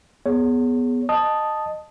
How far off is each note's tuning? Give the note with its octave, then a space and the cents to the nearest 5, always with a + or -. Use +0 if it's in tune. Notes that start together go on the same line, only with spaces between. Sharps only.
B3 +0 G#4 +0 C#5 +15
D#5 -15 A5 +0 D#6 +0